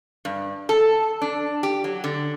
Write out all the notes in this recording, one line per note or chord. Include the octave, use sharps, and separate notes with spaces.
G2
A4
D4
G4
F#3
D3